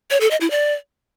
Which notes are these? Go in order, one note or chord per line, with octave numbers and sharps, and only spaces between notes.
C#5
A4
D#5
E4
D5